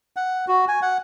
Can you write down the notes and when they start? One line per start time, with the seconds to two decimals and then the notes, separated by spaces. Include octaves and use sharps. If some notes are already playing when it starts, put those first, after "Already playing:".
0.16 F#5
0.48 F#4
0.68 G#5
0.82 F#5